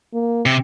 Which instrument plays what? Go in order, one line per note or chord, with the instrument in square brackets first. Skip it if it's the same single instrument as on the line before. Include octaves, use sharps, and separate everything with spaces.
[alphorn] A#3
[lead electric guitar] C3